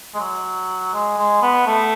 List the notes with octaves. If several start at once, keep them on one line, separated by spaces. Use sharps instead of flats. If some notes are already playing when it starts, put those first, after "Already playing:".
G#3
F#3
G#3
G#3
B3
A3